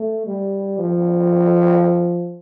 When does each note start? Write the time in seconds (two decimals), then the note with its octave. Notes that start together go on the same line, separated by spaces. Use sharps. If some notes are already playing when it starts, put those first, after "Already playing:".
Already playing: A3
0.27 G3
0.79 F3